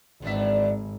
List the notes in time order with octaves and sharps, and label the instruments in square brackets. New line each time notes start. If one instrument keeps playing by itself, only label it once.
[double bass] G#1 [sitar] E2 D4 E5